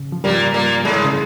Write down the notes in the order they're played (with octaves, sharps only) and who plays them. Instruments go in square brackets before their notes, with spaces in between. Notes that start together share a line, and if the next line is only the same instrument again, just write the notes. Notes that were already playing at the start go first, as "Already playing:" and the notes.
Already playing: [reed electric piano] C#3
F3
[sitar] A#2 A#3 [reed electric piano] G3
[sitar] A#2 A#3
G#2 G#3
[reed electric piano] C#3